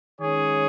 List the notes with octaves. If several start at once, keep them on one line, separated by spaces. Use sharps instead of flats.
D#3 G#3 C#4 G#4 C#5